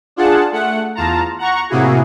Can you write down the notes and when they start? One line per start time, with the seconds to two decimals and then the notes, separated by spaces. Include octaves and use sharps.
0.16 D4 F4 G#4 F#5 A5
0.52 A3 F#5
0.95 E2 F4 A5 A#5
1.39 F#5 A#5 C#6
1.70 A2 C3 A#3 E4 F#4 G#4